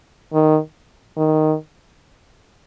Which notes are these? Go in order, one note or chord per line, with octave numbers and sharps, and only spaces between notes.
D#3
D#3